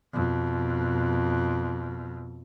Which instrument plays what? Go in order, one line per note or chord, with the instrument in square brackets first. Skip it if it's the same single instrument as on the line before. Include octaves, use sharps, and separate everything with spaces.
[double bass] F2 B2